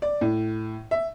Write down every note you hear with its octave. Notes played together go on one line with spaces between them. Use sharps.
D5
A2
E5